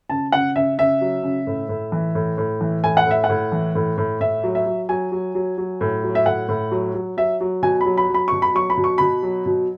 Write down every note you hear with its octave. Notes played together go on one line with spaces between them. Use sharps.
C#3 A5
C#3 F#5
C#3 E5
C#3 E5
F#3
C#3
A2
A2
E3
A2
A2
E3
A2 G#5
F#5
A2 E5
F#5
A2
E3
A2
A2
A2 E5
F#3
E5
F#3
F#3 G#5
F#3
F#3
F#3
A2
F#3
E5
A2 F#5
A2
F#3
F#3
F#3 E5
F#3
B2 G#5
B5
F#3
B5
F#3
B5
B2 C#6
B5
F#3 C#6
B5
B2
C#6
B2 B5
F#3
B2